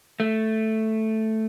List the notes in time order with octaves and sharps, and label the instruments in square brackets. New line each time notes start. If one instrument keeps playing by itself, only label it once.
[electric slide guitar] A3